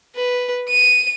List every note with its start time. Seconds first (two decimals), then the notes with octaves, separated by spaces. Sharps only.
0.16 B4
0.70 D#7